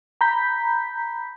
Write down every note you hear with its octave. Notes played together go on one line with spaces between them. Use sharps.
A#5 B5 G6 B6